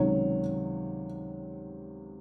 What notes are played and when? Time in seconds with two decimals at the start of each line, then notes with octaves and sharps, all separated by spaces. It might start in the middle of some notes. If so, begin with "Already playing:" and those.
Already playing: C#2 C3 D#3 F#3 C#5